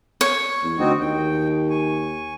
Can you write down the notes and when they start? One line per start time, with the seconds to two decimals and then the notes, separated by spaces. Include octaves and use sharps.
0.21 C#5
0.63 E2
0.79 D2 C4 D#4 F#4
1.00 D#2 G5
1.70 G#5 C#6